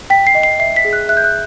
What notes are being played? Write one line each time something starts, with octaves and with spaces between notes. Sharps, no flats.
G5 B6
C7
D#5
C7
E5 C7
B6
G#4
F#6
E5 F#6
G6
F#6